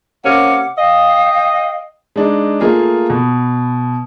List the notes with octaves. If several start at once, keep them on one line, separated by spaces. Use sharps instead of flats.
C3 A#3 C#4 F#5 D6
D#5 F5 G5
G#3 D4 D#4
A3 A#3 F4 G#4
B2